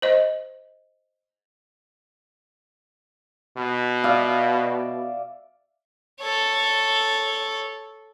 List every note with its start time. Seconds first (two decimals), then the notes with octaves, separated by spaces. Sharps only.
0.02 C5 D#5
3.57 B2
4.04 D5 E5 F5
6.21 A4 C#5